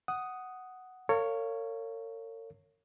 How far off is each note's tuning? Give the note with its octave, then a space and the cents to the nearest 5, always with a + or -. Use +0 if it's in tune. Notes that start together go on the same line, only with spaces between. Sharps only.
F#5 +5 D#6 +0
A#4 -45 C#5 +0 F5 +0